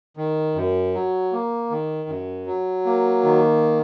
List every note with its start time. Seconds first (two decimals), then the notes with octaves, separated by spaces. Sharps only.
0.17 D#3
0.55 F#2
0.94 F#3
1.32 A#3
1.70 D#3
2.08 F#2
2.47 F#3
2.85 A#3
3.24 D#3